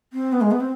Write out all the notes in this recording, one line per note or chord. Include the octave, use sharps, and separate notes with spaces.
C4
B3
G#3
B3
C4